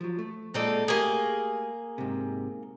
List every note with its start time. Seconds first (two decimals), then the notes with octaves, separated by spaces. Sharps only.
0.01 F3 F#3
0.19 A3
0.54 A#2 G#3 C4 D#4 A4 D5
0.88 A3 A#3 G4 G#4
1.98 G#2 C3